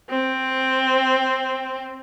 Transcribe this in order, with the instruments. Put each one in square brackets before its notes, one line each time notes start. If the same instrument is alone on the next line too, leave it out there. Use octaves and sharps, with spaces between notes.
[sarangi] C4